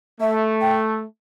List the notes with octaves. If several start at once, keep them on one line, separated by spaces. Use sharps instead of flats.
A3 E5
G5